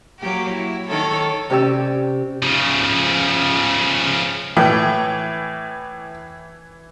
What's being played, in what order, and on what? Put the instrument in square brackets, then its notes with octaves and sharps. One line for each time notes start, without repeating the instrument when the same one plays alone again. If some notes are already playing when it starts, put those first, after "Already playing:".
[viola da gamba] F#3 A#3 G4
E4
D#3 A4 C#5
[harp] C3 C#4 G4 D5 G5 E6
[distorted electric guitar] C#3 F3
[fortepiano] A2 [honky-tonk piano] E3